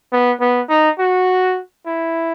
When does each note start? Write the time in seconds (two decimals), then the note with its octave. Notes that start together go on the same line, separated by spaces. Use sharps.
0.13 B3
0.41 B3
0.70 D#4
0.99 F#4
1.87 E4